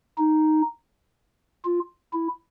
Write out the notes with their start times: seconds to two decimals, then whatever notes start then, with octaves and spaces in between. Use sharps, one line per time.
0.18 D#4
1.65 F4
2.13 E4